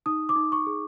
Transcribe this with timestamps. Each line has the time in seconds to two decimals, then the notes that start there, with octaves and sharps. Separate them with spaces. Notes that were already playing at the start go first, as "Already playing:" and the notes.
0.06 D#4 D#6
0.29 D6
0.36 D#4
0.52 C#6
0.67 G#4